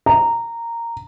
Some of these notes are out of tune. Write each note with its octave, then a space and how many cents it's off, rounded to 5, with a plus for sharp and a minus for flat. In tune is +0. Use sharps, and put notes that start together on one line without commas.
A#5 -10